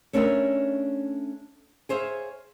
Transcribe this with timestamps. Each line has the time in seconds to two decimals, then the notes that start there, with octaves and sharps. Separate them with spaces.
0.13 A3 C#4 D4 A#4 C#5 E5
1.89 G#4 C5 C#5 E5 F5